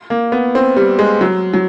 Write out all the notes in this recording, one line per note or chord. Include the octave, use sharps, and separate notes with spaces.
A#3
B3
C4
G3
G#3
F#3
F#3